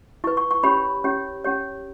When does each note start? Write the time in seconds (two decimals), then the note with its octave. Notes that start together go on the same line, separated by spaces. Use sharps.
0.24 E4 B4 C#6
0.37 C#6
0.51 C#6
0.63 C#4 G4 C#5 B5
1.04 C#4 G4 C#5
1.44 C#4 G4 C#5